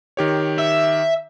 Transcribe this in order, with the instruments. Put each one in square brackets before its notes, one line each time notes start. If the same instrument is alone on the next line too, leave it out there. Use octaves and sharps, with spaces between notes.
[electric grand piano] D#3 G4 C#5
[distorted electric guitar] E5